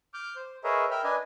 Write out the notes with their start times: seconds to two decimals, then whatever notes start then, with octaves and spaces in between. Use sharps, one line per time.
0.14 D6 F6 G6
0.36 C5
0.64 G#4 A#4 B4 C#5 D#5 E5
0.91 A#4 E5 G5 B5 F6
1.04 D4 B4 D#5 G#5